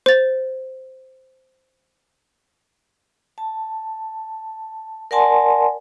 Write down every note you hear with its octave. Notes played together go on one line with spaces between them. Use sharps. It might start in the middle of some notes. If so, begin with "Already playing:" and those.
C5 A6
A5
A#4 D5 F#5 G#5 A5 C6